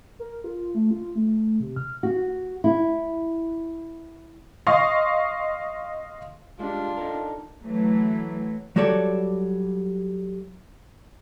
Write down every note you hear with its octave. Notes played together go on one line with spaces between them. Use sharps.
A#4
F4
A3
F4
A3
C3
F6
F#4
E4
D#5 F5 C6 C#6
G3 G#3 D4 F4
D#4 A4 A#4
E3 F#3 A3
F#3 G3 F#4 A4 C#5 D5